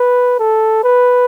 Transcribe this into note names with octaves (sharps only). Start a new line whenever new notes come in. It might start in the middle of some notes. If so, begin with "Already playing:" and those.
Already playing: B4
A4
B4